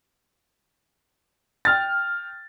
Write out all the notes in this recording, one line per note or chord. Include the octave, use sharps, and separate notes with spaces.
G5 F6 A6